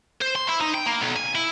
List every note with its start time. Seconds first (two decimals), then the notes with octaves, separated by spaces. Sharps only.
0.21 C5
0.35 C6
0.48 E4
0.60 D#4
0.74 G5
0.86 A#3
1.02 B1
1.16 G#5
1.35 E4